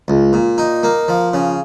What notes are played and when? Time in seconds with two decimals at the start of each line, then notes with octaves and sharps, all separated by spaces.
0.08 C#2
0.33 A#2
0.58 D#4
0.83 A#3
1.08 F3
1.34 C#3